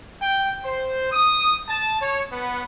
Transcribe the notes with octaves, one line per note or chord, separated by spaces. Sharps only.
G5
C5
D#6
A5
C#5
B3